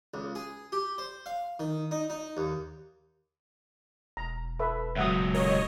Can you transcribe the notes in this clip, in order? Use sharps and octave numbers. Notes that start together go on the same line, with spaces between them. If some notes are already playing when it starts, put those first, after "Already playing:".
C#2
G#4
G4
C5
F5
D#3
D#4
D#4
D#2
E1 A#5
A4 B4 E5
C#2 F#3 E5 F#5 D#6
A#4 C#5 D#5